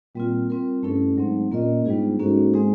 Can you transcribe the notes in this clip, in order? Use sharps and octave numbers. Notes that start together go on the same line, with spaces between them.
A#2 G3 C4 F4
G3 C4 F4 A#4
G2 A3 C#4 E4 A4
G#2 F#3 A3 C4
A#2 A#3 C#4 F4 A#4 D#5
G#2 G3 B3 D4 F4 G#4
G#2 A#3 C#4 F#4 A4
G#3 C4 D#4 G#4